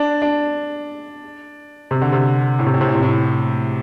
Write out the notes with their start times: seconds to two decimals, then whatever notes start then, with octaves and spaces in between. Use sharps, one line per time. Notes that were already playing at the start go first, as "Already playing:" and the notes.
Already playing: D4
0.22 D4
1.91 C3
2.01 D3
2.12 C3
2.59 A2
2.67 C3
2.74 A2
2.81 C3
2.89 A2
2.95 C3
3.02 A2